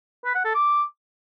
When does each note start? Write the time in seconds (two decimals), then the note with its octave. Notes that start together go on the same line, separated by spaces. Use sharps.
0.25 B4
0.35 F#5
0.45 A4
0.54 D6